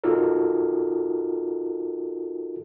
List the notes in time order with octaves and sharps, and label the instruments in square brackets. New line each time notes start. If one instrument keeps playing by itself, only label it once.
[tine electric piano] D#4 F4 F#4 A4 A#4